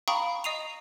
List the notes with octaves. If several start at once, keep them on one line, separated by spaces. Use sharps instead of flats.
F5 G5 A#5 B5 C#6 D#6
D#5 D#6 C7 D#7 F7